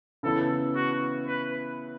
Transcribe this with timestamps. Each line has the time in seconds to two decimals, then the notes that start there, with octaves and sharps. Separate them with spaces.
0.23 C#3 E3 B3 E4 A4
0.75 F#4
1.27 B4